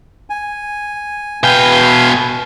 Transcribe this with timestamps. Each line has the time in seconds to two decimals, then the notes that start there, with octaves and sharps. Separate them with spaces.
0.30 G#5
1.43 B2 B4 F5 G5 G#5